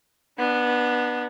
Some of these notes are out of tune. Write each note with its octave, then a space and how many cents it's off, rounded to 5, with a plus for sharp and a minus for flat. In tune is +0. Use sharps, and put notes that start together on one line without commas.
B3 -15 D4 +25